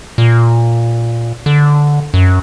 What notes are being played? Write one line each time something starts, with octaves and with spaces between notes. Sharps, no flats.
A#2
D3
F#2